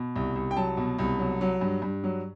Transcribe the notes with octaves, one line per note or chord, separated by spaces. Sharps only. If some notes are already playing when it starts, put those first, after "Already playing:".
Already playing: B2
C2
C2
G5
F#3 A5
B2
C2
F#3
F#3
G2
G2
F#3